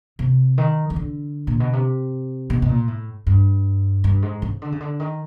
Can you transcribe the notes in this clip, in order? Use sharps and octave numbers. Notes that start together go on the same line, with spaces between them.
C3
D#3
D#3
D3
A#2
B2
C3
B2
B2
A#2
A2
G2
G2
G#2
C#3
D3
C#3
D3
D#3